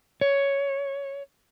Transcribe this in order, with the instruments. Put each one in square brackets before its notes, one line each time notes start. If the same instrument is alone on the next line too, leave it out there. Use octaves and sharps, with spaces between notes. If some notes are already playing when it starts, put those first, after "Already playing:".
[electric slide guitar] C#5